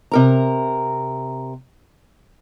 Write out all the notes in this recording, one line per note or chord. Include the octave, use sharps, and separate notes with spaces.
C3 A#4 A#5